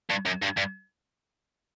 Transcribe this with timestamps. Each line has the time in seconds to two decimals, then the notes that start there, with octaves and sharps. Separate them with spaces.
0.10 G2
0.25 F#2
0.42 G2
0.57 G2